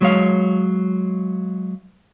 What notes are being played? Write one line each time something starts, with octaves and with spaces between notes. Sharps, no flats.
F#3 G#3 C#5 F5